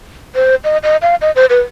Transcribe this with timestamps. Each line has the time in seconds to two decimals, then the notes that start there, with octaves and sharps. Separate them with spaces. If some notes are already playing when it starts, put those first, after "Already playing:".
0.35 C5
0.64 D#5
0.83 D#5
1.02 F5
1.21 D#5
1.36 C5
1.50 B4